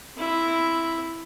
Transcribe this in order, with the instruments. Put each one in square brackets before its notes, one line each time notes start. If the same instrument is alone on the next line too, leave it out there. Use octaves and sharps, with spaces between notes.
[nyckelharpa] C4 E4